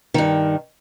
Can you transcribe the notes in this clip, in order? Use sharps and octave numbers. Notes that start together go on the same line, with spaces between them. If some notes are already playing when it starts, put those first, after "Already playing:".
G2 D#3